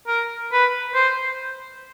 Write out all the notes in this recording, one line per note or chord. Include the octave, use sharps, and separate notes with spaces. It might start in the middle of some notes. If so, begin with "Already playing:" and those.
A#4
B4
C5